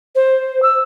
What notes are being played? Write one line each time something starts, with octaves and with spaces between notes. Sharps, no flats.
C5
E6